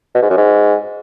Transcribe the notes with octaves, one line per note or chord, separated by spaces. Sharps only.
B2
G#2
F#2
G#2